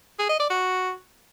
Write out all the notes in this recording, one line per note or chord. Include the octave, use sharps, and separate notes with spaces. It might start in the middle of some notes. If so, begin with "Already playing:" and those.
G#4
D#5
D5
F#4